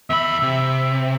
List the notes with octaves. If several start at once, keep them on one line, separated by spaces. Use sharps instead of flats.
E2 E5 B5
C3